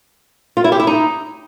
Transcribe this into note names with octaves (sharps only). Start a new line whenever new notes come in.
F4
E4
G4
E4
D#4